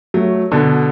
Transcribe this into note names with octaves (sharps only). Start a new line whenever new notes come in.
F#3 A3
B2 D3